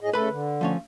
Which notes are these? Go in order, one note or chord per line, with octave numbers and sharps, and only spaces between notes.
A2 G#4 D#5
C#3 A3 A4 B4 B5
D3
F3 A3 C#4